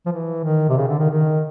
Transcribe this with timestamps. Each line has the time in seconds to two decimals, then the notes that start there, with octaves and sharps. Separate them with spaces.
0.06 F3
0.12 E3
0.44 D#3
0.69 C3
0.77 C#3
0.88 D3
0.99 D#3
1.10 D#3